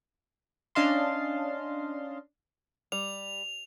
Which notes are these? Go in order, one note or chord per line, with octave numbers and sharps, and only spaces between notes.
C#4 D4 D#5 F5 A5 C6
G3 F7